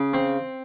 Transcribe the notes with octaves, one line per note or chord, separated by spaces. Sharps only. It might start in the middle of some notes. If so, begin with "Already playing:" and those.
Already playing: C#3
C4